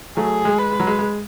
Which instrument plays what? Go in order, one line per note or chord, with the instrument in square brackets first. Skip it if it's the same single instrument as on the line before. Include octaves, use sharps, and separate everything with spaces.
[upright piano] F#3 A3 [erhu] G#4
[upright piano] G#3
[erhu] B4
[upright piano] G#3
F#3
G#3
G#3